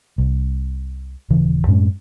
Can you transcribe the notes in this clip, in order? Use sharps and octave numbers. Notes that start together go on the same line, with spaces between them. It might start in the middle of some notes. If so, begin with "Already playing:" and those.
C2
D#1 C#3 E3
F#2 A2 G#3 C#4